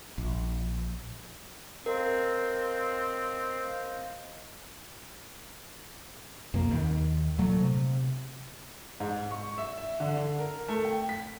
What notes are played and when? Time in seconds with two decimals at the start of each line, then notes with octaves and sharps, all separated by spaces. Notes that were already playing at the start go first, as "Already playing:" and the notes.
0.18 A#1
1.86 C4 A#4 C5 D#5 F5
6.54 F2 B2 A#3
6.70 D#2 D#3
7.38 A#2 F#3 A3
7.60 C3
9.00 G#2
9.31 C#6
9.58 E5
9.78 E5
10.00 D3
10.16 D3
10.39 A#4
10.68 A3
10.85 G5
11.09 B6